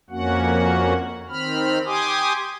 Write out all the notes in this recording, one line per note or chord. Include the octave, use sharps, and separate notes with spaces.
F2 A#3 C#4 F#4 F#5
D#3 C4 B5 F6
G4 G#5 C6 D6 D#6